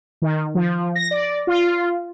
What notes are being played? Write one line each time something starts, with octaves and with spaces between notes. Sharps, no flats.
D#3
F3
A#6
D5
F4